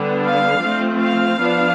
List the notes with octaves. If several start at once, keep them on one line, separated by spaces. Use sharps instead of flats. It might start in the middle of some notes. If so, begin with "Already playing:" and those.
Already playing: D3 G3 B3 D4
F5
F3 A3 C4
F5
F3 B3 D4